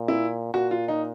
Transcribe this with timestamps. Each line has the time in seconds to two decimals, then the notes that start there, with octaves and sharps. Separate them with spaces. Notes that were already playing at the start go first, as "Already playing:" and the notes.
Already playing: A#2
0.08 E4
0.54 A#2 F#4
0.71 F4
0.88 D#4